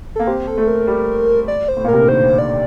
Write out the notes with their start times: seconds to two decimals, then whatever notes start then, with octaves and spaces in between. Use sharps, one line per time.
0.16 A#3 A4
0.27 C4 G4
0.47 A4
0.58 A3
0.68 A#4
0.87 G3
1.48 D5
1.68 C5
1.77 A2
1.84 A#2
1.88 C3 A#4
2.00 D3
2.08 D#3 C5
2.38 D5